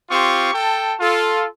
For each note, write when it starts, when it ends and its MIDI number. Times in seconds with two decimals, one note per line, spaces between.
0.10 0.50 60
0.10 0.50 65
0.10 0.50 67
0.10 0.50 85
0.54 0.95 69
0.54 0.95 79
0.54 0.95 81
1.00 1.46 65
1.00 1.46 69